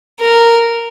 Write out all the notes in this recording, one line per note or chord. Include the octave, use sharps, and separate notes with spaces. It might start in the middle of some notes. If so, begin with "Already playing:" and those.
A#4